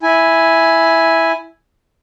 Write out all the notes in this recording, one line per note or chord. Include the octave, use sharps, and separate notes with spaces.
E4 G#5